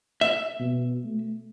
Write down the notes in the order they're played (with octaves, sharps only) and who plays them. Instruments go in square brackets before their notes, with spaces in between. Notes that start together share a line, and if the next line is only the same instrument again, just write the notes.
[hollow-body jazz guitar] E5
[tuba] B2
A3